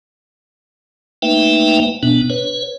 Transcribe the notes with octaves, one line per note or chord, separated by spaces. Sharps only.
A3 A#3 D#4 B4 E5 G5
B2 B3 D4
B4 C#5